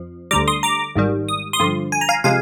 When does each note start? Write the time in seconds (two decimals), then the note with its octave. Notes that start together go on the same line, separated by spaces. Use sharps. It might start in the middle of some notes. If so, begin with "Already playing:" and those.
Already playing: F2 F3
0.31 D2 D3 G3 A#5 D6
0.48 C6 D#6
0.63 A#5 D6
0.96 G#1 G#2 D#3 G3
1.28 D#6
1.53 C6 D#6
1.60 G2 D3 F3
1.92 G#5
2.01 A#5
2.09 F5 G#5
2.24 C3 F3 G#3 F5 G#5